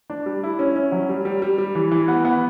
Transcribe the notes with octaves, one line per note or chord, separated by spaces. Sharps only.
D4
G3
E4
C#4
C#4
F#3
G3
G3
G3
G3
E3
E3
B3
B3